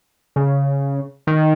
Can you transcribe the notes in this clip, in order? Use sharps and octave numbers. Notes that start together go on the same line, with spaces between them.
C#3
D#3